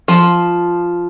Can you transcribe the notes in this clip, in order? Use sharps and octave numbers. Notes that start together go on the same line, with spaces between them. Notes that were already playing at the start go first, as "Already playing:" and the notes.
F3